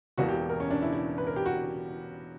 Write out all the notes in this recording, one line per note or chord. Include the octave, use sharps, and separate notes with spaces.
E1 E2 B2 A#3 F#4
G4
A#4
C#4
D4
E4
E4
B4
A#4
G4
F#4